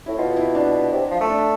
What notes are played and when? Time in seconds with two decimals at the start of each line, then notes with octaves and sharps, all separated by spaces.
0.06 A2 E4
0.18 B2 F4
0.37 E4
0.55 D4
0.92 C3
1.11 F3
1.20 A3
1.29 D4